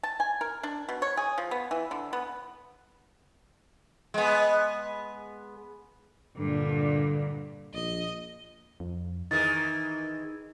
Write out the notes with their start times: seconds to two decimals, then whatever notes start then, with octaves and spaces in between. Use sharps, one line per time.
0.03 A5
0.20 G#5
0.41 A#4
0.63 D4
0.89 B2
1.02 C#5
1.17 G#4
1.38 F3
1.51 B3
1.71 E3
1.91 D3
2.13 B3
4.14 G#3 B3
6.38 G2 A#2 D3
7.74 A#1 D#5
8.80 F2
9.31 D#3 E3 D#4 G#4 A6